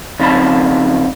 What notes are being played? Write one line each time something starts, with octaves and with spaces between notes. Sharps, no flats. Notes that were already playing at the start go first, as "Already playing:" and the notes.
C#3 F3 C4 D#4 A5 B5